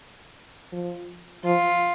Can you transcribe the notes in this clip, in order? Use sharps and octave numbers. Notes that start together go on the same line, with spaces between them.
F3
F3 F4